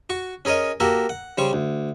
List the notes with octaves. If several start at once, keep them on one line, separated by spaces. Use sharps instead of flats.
F#4 C#6
C#4 G#4 A#4 C#5 D#5
A#3 F#4 G4 A4 A#4
F#5
C#3 G3 C5 C#6
D2